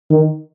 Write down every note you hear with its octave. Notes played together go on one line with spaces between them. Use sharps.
D#3